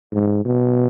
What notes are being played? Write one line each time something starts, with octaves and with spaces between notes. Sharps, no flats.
G#2
B2